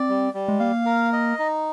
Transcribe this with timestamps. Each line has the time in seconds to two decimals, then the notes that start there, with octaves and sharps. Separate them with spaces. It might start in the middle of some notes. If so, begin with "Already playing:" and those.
Already playing: C4 D5
0.09 G3
0.34 G3
0.48 G#3
0.60 A#3 F5
0.86 A#4
1.13 D#5
1.39 D#4